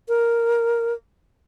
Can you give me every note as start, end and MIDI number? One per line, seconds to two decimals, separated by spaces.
0.08 0.93 70